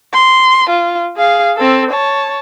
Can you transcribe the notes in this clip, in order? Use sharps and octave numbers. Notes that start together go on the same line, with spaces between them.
C6
F4
G#4 F5
C4 A4
C#5 A5